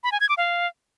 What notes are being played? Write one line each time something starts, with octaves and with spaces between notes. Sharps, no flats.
B5
G#5
G#6
D6
F5